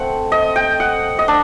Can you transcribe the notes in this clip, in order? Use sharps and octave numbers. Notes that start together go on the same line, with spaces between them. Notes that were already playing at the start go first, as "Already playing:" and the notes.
Already playing: A3 C4 F#5
D#5
G5
F#5
D#5
D4